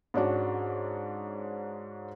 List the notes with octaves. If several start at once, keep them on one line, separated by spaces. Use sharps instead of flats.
G#2 C#4 D4 F#4